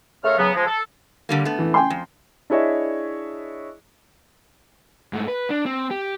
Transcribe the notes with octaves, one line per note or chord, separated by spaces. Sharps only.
C#3 A3 A#4 C#5 F5 F6
C#3 F#3 B3
F3 G#3
A4
D3 G3 A#3
A3 B3
E3
G5 G#5 C6
F2
D4 E4 G#4 C#5 D#5 E5
G#2 A3
B4
D4
C4
G4